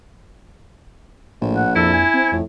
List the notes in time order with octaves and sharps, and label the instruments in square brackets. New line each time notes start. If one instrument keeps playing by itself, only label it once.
[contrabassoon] A#1 [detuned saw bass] A2
[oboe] F#5
[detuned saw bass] F2 [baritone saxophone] E4 [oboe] A4
[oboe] G#5
[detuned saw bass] C4
[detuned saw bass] F2 [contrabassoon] A2